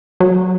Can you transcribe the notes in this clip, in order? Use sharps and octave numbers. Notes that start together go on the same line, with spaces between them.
F#3